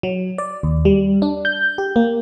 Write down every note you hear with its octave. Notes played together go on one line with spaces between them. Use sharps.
F#3
D5
D#2
G3
D4
G6
G4
A#3